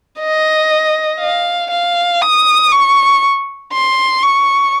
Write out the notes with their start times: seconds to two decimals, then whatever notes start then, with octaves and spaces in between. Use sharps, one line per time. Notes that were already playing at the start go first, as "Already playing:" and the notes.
0.20 D#5
1.20 F5
1.71 F5
2.21 D#6
2.72 C#6
3.73 C6
4.23 C#6